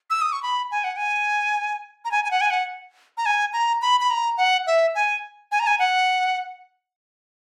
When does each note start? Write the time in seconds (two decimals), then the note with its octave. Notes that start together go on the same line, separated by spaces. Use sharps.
0.10 E6
0.22 D#6
0.32 C#6
0.43 B5
0.71 G#5
0.84 F#5
0.97 G#5
2.05 A#5
2.12 G#5
2.25 G#5
2.31 F#5
2.41 G#5
2.50 F#5
3.17 A#5
3.26 G#5
3.53 A#5
3.82 B5
4.01 B5
4.10 A#5
4.38 F#5
4.67 E5
4.95 G#5
5.52 G#5
5.60 A#5
5.67 G#5
5.79 F#5